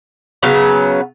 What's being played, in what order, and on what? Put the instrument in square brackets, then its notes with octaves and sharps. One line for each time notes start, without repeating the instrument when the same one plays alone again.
[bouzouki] C#3 F#3 B3 C#4